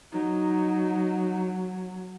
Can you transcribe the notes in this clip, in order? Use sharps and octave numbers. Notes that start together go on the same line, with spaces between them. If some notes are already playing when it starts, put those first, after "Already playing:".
F#3 D#4